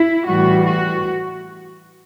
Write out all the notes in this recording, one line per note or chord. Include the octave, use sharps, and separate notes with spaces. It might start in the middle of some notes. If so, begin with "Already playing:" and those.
Already playing: E4
A2 E3 G3 F#4
F#4